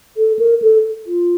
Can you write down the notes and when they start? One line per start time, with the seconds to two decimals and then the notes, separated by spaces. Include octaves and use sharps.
0.17 A4
0.39 A#4
0.62 A4
1.07 F4